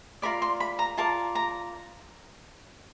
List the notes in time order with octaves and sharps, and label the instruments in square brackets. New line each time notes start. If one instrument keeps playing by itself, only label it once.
[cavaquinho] F4 A#4 D5 B5
C6
B5
A#5
F4 A#4 D5 A5
A#5